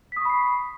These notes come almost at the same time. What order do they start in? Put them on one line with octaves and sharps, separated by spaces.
B6 D#6 C#6 B5 C7